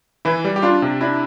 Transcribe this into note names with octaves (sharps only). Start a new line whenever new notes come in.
E3 E4
G3
G4
D4 F4
C3
D4 E4